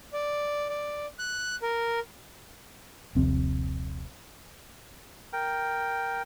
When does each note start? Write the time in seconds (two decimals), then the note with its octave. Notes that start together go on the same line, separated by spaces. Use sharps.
0.13 D5
0.69 D5
1.19 F#6
1.62 A#4
3.15 D#1 A#1 C3 C4
5.33 A#4 G5